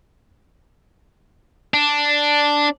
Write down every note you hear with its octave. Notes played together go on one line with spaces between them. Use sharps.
D4